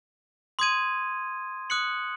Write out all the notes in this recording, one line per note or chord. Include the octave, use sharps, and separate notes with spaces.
C6 D#6 G#6 D#7
D#6 F#6 C#7 F#7